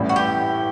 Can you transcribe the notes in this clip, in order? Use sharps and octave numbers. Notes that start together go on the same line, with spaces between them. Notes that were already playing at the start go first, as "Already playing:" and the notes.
Already playing: A1 A2 E3 G3
F#4
G4